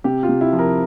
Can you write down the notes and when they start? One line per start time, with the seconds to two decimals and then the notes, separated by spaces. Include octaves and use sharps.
0.04 C3 G4
0.23 F4
0.29 C3
0.41 E4
0.53 F3
0.59 A#4